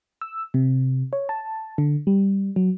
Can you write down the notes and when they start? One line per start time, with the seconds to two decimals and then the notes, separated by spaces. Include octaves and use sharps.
0.21 E6
0.54 C3
1.13 C#5
1.29 A5
1.78 D3
2.07 G3
2.56 F#3